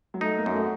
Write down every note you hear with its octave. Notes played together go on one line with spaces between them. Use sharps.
F#3
A3 D#4
A#3
F#2
A3